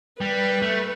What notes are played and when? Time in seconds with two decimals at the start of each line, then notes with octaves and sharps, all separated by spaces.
0.21 G3 B4
0.62 A3